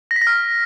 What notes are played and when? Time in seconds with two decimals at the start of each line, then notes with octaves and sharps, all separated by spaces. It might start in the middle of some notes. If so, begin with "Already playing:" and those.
0.11 A#6
0.16 B6
0.21 A#6
0.27 F6